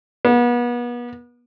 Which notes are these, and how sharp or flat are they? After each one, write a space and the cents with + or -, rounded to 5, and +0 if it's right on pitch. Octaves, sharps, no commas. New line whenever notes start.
B3 -35